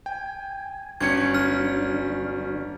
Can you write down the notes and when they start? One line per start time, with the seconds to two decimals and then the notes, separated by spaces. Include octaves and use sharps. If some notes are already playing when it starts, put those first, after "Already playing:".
0.06 G5 G#5
1.00 G1 D3 F#3 C#4 D4 G#6 C#7
1.34 F6